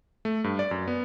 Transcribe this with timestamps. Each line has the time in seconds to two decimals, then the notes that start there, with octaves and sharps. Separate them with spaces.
0.25 A3
0.44 G2
0.59 D5
0.71 F#2
0.88 B3